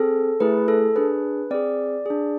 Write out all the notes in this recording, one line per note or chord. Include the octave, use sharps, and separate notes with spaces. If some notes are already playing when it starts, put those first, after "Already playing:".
Already playing: C4 G#4 A4
A3 E4 G#4 B4
A4
D4 G#4 B4
C4 G#4 D5
D4 G#4